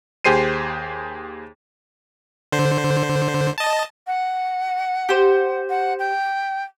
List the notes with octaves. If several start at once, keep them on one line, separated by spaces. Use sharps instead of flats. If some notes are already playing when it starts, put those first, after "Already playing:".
D#2 G4 G#4 C5 C7 D#7
D3 C5
D#5 A5
F#5
G4 C5
F#5
G5